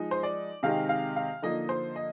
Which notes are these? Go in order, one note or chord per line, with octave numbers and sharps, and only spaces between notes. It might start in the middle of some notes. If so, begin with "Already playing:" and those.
Already playing: F3 G#3 D#4
C5
D5
C3 D#3 G#3 C4 D#4 F5
F5
F5
D3 F3 A#3 D#4 D#5
C5
D#5